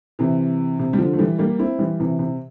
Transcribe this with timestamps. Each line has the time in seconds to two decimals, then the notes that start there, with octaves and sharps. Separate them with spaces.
0.19 C3 E3
0.79 C3
0.93 G3
0.99 D3 F3
1.13 A3
1.19 E3 G3
1.39 G3 A#3
1.59 C4 E4
1.79 E3 G3
2.00 C3 E3
2.19 C3